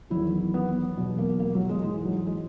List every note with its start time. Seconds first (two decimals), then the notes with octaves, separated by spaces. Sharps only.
0.10 E2 D#3 F#3 E4
0.54 B3
0.97 E2 B2 F#3
1.18 A#3
1.39 A#3
1.55 F#3
1.69 G#3
1.83 G#2 E3 G#3
2.05 F#3
2.26 G#3